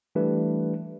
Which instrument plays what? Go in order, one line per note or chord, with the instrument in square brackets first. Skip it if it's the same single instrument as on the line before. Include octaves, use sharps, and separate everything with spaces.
[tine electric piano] E3 G3 A3 D4 G4 B4